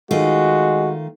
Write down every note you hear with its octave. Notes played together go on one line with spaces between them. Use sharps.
D#3 G#3 A3 F4 F#4